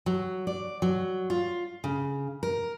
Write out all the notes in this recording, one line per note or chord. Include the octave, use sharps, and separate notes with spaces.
F#3
D5
F#3
F4
C#3
A#4